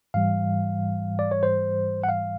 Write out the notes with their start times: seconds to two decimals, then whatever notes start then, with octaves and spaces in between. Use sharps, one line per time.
0.14 G#2 E3 G3 F5
1.19 D5
1.31 C#5
1.43 C5
2.04 F#5
2.09 F5